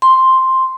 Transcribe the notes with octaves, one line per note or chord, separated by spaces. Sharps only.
C6